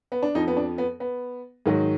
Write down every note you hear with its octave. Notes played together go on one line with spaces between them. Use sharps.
B3
D4
F2 F3 D#4
B3
D4
B3
B3
G#2 D#3 F#3